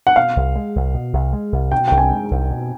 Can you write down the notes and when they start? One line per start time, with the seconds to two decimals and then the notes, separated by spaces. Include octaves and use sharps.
0.07 F#5
0.16 B2 F5
0.36 C2
0.56 G#3
0.76 C2
0.94 B2
1.13 C2
1.33 G#3
1.52 C2
1.72 B2 G5
1.88 C2 G5
1.98 G#5
2.12 G#3
2.31 C2
2.50 B2